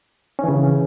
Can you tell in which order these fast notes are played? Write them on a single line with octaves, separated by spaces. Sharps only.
C#4 E3 C#3